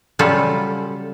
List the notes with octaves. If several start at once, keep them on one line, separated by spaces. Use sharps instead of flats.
C#3 F#3 G3 F4 A4